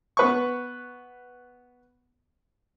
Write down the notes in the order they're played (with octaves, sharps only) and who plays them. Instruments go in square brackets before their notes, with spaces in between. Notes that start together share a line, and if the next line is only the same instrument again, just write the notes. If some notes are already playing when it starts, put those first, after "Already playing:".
[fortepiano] B3 B4 C#6